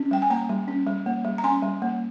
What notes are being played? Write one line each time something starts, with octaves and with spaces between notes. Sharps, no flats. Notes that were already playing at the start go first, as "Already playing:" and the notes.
Already playing: C#4
G3 G5
G#5
A#3 G5 A#5
G3
C#4
G3
A#3
G3
A#5
C#4 G#5 C6
G3
A#3